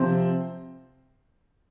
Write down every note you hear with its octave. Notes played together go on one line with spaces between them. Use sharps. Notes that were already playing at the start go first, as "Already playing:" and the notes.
Already playing: C3 F3 C4 C5